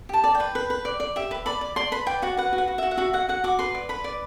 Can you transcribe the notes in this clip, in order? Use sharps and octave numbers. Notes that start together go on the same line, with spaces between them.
G4 A5
D5
G5
B4
B4
B4
D5
D5
G4 E5
B4
D5 B5
D5
D5 C6
B4 B5
D5 G5
F#4 F#5
B4 F#5
F#4
F#5
F#4
F#4 E5
F#5
F#4 E5
F#4 F#5
F#4 F#5
F#4 D6
B4 C6
D5
B4 B5
D5